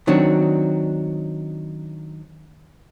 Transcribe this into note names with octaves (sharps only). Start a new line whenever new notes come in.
D#3 F#3 C4 D4 F#4